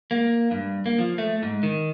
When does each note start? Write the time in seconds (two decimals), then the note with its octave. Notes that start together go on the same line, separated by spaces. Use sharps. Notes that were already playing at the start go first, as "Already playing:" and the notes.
0.11 A#3
0.51 G2
0.86 A#3
0.99 F3
1.18 A3
1.43 G#2
1.63 D#3